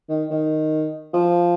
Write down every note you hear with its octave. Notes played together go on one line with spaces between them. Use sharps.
D#3
D#3
F3